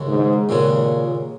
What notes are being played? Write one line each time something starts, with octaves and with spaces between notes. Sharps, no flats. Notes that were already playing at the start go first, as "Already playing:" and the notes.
Already playing: D#2 C#3 G#3 C#4 F#4
G#2
D#2 A#2 C#3 G#3 C#4 F#4